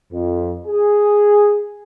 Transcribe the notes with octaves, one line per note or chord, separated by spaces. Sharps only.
F2
G#4